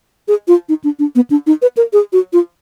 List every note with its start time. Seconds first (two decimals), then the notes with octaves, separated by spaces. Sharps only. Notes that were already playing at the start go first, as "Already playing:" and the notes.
0.28 G#4
0.48 F4
0.69 D#4
0.84 D4
0.99 D4
1.15 B3
1.30 D4
1.47 D#4
1.62 B4
1.77 A#4
1.93 G#4
2.13 F#4
2.33 F4